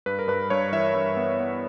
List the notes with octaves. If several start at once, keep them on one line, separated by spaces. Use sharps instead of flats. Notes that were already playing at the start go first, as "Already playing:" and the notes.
G2 B4
A#4
G2 B4
G2 C#5
E3 E5
G2
B3
B3